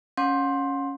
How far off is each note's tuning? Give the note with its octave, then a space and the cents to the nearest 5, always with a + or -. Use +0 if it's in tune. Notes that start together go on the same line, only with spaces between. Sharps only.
C#4 +0 F#5 -45 C6 +15